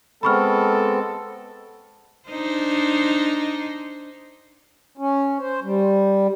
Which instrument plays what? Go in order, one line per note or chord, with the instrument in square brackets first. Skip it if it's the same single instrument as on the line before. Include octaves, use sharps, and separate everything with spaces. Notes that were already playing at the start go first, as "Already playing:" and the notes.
[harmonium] G#3 B3 C4 [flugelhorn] A4 [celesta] B5 C#6 F6
[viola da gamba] D4 D#4 C5
[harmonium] C#4
C5
G3